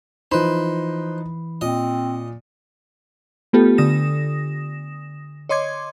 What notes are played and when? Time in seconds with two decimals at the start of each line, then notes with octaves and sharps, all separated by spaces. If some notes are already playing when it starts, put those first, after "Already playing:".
0.32 E3 F3 D#4 B4 C5 B5
1.61 A#2 C4 D#5
3.53 A3 B3 F4 G4 A4
3.78 D3 D#6 A#6 E7
5.49 C#5 D#5 C6 D6 G#6